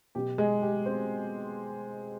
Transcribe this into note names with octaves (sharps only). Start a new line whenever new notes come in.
B2 F#3 G4
G#3 G#4
G4
C4 C5